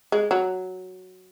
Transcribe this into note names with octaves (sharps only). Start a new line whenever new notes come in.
G#3
F#3